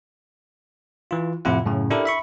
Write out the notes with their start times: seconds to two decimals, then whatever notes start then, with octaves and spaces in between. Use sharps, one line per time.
1.11 E3 F4
1.45 F2 A2 C3 E4 F4 F#5
1.66 F#2 A2 C#3
1.90 D4 E4 G4 A4 A#4
2.05 E5 B5 C#6